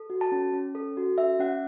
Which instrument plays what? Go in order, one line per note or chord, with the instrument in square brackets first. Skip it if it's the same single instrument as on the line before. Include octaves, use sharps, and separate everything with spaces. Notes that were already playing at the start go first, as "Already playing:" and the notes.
Already playing: [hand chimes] A4
F#4
A5
C#4
C#4
A4
F#4
C#4 E5
C#4 F#5